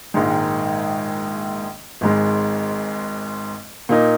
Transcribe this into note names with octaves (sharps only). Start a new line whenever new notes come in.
A#1 G#2 D#3 G#3
G#1 G#2 G#3
A#2 A#3 D#4